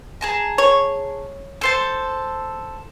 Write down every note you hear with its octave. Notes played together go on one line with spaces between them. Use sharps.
G#4 A5 A#5
C#5
A4 C5 A5